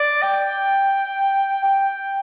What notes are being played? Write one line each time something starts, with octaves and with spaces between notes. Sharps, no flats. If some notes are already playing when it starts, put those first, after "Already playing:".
Already playing: D5
G5
G5